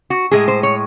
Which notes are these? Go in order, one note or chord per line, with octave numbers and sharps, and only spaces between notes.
F#4
A2 G#3 G#4
C5
C#5